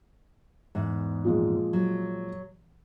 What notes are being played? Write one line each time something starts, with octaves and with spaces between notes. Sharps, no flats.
E2 G#2
A#2 F3 G#3
F#3